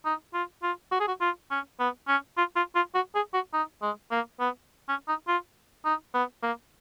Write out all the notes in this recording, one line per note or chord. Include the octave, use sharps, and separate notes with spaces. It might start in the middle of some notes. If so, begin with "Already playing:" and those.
D#4
F4
F4
F#4
G#4
F#4
F4
C#4
B3
C#4
F4
F4
F4
F#4
G#4
F#4
D#4
G#3
A#3
B3
C#4
D#4
F4
D#4
B3
A#3